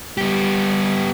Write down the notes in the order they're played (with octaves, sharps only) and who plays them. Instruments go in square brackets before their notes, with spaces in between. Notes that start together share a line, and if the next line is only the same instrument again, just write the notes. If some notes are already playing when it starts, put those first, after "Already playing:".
[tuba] G3 [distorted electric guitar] B3 G4